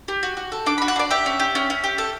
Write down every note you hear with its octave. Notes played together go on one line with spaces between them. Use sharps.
G4
F#4
F#4
A4
D4 D6
F#4 B5
F#5
D4 D5
G4 E5
C#4
G4
C#4
C#4
G4
A4